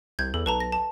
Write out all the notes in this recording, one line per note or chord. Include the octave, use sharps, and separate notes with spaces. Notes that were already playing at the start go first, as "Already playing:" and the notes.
C2 G6 G#6
E2 A4
B1 B4 A5 A#5
A#6
A5